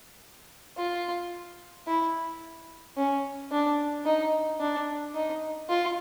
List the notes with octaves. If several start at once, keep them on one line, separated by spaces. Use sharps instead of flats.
F4
E4
C#4
D4
D#4
D4
D#4
F4